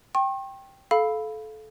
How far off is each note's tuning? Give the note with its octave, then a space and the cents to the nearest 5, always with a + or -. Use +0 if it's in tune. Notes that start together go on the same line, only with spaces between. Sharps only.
G5 +0 C#6 -45
A4 -25 F5 +0 B5 +0